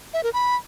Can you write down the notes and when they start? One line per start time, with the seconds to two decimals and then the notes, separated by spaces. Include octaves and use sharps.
0.14 E5
0.23 A#4
0.33 B5